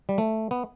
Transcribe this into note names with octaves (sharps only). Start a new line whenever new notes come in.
G3
A3
B3